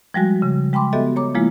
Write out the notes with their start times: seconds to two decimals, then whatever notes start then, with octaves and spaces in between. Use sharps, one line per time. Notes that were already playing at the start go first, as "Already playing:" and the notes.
0.14 F3 G3 G#3 F#4
0.42 C#3
0.73 G#3 G5 B5 C6 D6
0.93 B3 F#4 G4 A4 D#5 E5
1.16 C#5 A#5 D6
1.35 F3 G#3 A#3 E4 F4